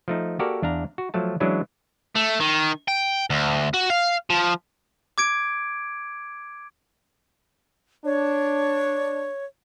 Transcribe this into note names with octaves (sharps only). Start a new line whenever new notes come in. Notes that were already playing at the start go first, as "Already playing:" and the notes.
F3 A3 D#4
A#3 F#4 G4 A4 A#4 D5
E2 D4 F5 A#5
F#4
F3 F#3 A3 A5
E3 F#3 G#3 C#4 D4 E4
A3
D#3
G5
D2
F#4
F5
F3
D6 G#6 D7
D4 C#5